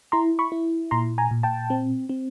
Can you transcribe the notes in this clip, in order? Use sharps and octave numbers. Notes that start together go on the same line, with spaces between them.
E4 A#5 C6
B5 C#6
E4
A#2 A#5 C6
G#5 A#5
A#2
G5 A5
C4
C4